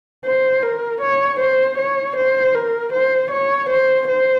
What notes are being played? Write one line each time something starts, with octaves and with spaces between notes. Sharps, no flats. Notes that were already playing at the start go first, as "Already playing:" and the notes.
C5
A#4
C#5
C5
C#5
C5
A#4
C5
C#5
C5
C5